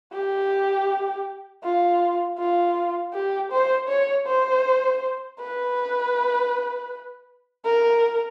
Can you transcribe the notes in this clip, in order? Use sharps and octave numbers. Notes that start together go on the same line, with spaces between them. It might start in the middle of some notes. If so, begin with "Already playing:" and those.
G4
F4
F4
G4
C5
C#5
C5
B4
A#4